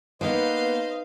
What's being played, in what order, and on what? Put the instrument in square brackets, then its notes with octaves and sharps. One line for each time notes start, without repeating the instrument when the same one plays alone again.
[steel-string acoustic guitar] A#3 B3 [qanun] D#4 B4 [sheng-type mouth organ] C5 D#5 [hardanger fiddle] F5